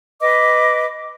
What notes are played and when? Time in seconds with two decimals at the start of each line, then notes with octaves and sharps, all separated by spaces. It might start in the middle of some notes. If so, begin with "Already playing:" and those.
0.21 B4 D#5 D6